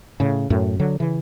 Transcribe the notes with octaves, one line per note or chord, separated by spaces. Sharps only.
A2 C#3
F#2 A2
D3 F#3
C#3 E3